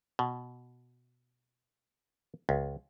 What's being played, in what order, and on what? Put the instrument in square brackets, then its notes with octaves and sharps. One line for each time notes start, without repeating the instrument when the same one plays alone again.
[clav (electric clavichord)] B2
C#2